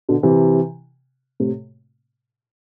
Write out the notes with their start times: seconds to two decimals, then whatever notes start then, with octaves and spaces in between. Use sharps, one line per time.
0.09 B2 D3
0.23 C3 E3
1.40 A2 C3